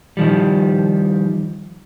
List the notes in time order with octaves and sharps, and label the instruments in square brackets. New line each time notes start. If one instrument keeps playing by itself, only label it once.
[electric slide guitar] D#3 F3 G3